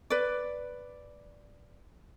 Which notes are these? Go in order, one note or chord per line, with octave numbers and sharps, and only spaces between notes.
B4 D5